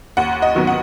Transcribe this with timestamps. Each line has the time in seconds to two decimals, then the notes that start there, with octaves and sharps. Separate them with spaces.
0.17 D#2 F#5
0.42 D#5
0.55 D#3 F#3 B3
0.67 F#5